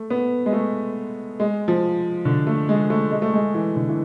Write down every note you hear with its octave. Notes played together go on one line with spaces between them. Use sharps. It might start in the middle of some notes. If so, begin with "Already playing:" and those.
Already playing: A3
B3
G#3
A3
G#3
F3
D3
A3
G#3
A3
G#3
A3
G#3
E3
D3
E3